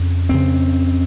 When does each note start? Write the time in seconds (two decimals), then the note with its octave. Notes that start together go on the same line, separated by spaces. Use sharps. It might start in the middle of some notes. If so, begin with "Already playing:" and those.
Already playing: F2 C#3
0.29 F2 C#3 C4